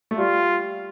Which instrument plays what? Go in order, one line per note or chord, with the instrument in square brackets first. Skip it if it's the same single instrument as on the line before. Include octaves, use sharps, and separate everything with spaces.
[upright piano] A3
[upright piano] G3 [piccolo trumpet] F4